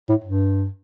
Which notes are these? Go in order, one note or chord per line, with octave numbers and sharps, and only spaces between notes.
A2
G2